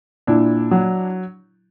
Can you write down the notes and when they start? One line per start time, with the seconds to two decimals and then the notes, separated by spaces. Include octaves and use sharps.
0.27 A#2 D4 E4
0.71 F#3